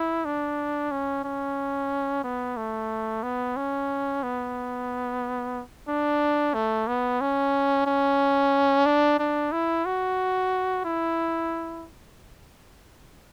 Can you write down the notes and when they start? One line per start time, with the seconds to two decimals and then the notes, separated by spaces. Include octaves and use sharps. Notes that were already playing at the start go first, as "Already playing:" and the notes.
Already playing: E4
0.25 D4
0.92 C#4
1.25 C#4
2.24 B3
2.57 A3
3.23 B3
3.57 C#4
4.23 B3
5.88 D4
6.54 A3
6.88 B3
7.21 C#4
7.87 C#4
8.86 D4
9.19 D4
9.52 E4
9.85 F#4
10.85 E4